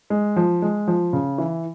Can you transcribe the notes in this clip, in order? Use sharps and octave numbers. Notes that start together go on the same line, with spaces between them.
G#3
F3
G#3
F3
C#3
E3